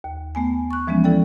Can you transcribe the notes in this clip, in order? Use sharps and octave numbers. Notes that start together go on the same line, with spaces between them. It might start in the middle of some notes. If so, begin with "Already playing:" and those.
D#2
A3 B3 G#5
C#6 F#6
E3 F3 G#3 B3 C#4
E4 A4 D5 G5